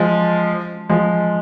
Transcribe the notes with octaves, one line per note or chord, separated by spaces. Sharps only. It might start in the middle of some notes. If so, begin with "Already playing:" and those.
Already playing: F3 G#3
F3 G#3